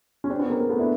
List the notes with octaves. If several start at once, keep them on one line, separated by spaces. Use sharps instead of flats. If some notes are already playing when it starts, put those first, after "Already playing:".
C#4
C4 D4
B3 C#4
A#3 C4
A#3
A3 B3
D4 E4